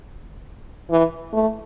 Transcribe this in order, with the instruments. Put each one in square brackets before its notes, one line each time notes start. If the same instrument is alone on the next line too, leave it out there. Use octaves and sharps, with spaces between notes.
[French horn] E3
A3